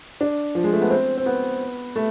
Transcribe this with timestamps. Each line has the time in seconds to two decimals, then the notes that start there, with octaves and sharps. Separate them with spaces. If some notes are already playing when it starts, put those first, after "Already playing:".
0.21 D4
0.55 F3
0.64 G#3
0.73 A3
0.81 B3
0.90 C4
1.17 C4
1.26 B3
1.96 A3